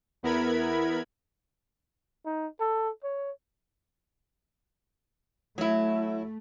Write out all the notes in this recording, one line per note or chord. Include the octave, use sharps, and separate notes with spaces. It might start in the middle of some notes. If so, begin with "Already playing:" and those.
E2 B3 E4 A#4 B5 G#6
D#4
A4
C#5
F#3 A3 E4